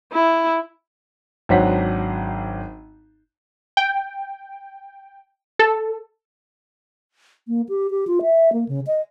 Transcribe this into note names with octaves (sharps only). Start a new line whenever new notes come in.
E4
G#1 F#3 D4 C5 F#5 B6
G5
A4
A#3
G4
G4
F4
E5
A#3
C#3
D#5